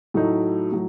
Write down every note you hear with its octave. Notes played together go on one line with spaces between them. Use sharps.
A2 F#3 A3 D#4
A2 F#3